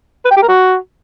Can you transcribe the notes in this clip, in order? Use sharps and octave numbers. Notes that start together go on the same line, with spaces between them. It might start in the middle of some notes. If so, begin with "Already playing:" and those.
B4
G5
G4
A#4
F#4